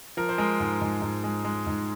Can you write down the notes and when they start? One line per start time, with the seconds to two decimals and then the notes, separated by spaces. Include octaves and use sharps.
0.17 F3 A#4
0.29 C5
0.38 G#3 A#4
0.60 G#2
0.82 G#2
1.02 G#2
1.24 G#3
1.45 G#3
1.67 G#2